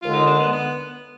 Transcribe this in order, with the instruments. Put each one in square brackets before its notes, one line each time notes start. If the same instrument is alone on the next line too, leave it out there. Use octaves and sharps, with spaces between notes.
[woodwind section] D#2 D3 G#3 [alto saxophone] F4
[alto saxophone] D#4
D4
B3
B3